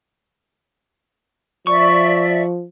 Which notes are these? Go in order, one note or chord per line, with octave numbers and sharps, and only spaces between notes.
F3 D5 E5 C#6